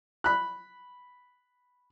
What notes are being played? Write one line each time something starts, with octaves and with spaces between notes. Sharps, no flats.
B5 F#6